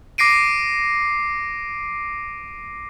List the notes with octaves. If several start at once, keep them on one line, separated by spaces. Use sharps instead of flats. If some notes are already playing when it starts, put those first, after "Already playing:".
D6 A#6 C7 D7 D#7